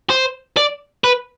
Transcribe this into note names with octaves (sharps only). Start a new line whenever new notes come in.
C5
D5
B4